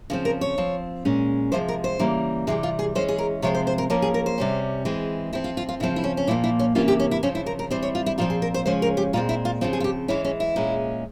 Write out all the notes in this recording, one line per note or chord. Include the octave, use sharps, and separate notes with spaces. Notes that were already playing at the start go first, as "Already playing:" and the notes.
C#3 F3 C4
A#4
C#5
F3 C4
A#2 G#3 C#4
C3 F3 G#3 C5
A#4
C5
C#3 E3 G3 A#3
C3 E3 G3 G#4
F4
G#4
E3 G#3 C#4 C5
G#4
A#4
C3 F3 G#3 C4 C#5
C5
C5
A#4
F3 A#3 C#4 A#4
G#4
A#4
C5
C3 G3 C#4
E3 G#3 C4
F3 C4 E4
F4
F4
F4
C#3 F3 C4 E4
E4
C#4
C#4
A#2 F3 A#3 E4
E4
C#4
C3 E3 A#3 C#4 F4
G4
C#4
E4
C#3 F3 C4 C#4
E4
A#4
A#4
E3 G3 C4 C5
C#5
F4
E4
A#2 F3 C4 F4
G#4
A#4
C5
C#3 F3 G#3 C#4 C5
A#4
G4
A#2 G#3 C4 F4
E4
F4
C#3 F3 C4 F4
G#4
F4
G4
E3 G#3 C#4 E4
C#4
E4
A#2 G#3 C#4